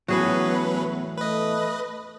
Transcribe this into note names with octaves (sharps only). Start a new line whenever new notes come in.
E2 A2 F#3 B3 C#4 F#4 G#4 B4
A3 B4 D#5